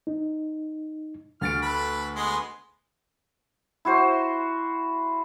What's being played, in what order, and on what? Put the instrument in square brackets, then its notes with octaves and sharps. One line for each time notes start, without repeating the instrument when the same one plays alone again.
[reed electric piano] D#4
[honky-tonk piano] D2 A6 D7 [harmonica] F6
[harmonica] A4 B4 B5
G#3 B3 C6
[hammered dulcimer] E4 F#4 C5